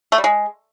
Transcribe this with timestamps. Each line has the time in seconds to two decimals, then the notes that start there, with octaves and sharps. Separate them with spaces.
0.12 A3
0.18 G3
0.24 G#3